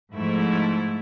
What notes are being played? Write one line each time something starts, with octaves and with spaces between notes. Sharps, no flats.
G#2 F3 A3 E4